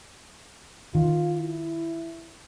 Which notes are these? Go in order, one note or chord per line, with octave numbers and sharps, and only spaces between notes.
D#3 F4
E4